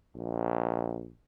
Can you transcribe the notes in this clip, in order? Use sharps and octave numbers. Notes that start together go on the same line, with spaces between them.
A#1